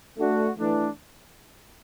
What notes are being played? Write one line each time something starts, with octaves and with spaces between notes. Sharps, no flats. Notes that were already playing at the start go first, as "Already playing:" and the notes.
A3 D4 F#4
E3 A3 D4